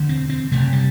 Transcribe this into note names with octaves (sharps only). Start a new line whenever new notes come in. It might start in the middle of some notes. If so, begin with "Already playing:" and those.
Already playing: E1 D2 D3
C4
C4
F#1 E2 C3 A3
G3